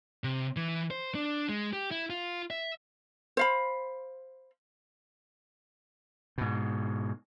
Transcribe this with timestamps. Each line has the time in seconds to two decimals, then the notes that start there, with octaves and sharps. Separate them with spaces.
0.24 C3
0.57 E3
0.91 C5
1.15 D4
1.49 G#3
1.73 G4
1.91 E4
2.10 F4
2.50 E5
3.37 C5 F5 B5
6.38 G#2 B2